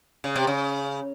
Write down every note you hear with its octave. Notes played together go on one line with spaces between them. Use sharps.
C#3
C3
C#3